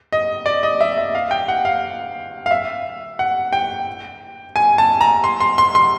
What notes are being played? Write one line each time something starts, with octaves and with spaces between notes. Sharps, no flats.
D#5
D5
D#5
E5
E5
F5
G5
F#5
F5
F5
E5
F#5
G5
G#5
A5
A#5
C6
C6
C6
C6